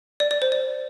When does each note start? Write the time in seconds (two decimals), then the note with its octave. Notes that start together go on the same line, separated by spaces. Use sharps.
0.20 D5
0.31 D5
0.42 C5
0.52 D5